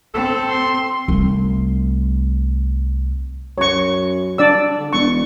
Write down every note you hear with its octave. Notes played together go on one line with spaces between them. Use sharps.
C4 A4
C6
C2 A3
F#2 C#5 C#6
D4 D5 E6
D3
E1 C#6